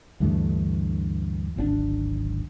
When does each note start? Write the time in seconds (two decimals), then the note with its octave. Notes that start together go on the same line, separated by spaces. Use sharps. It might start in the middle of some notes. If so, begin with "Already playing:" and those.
0.20 D2 G2 E3 A3
1.56 D1 G#1 C4 D4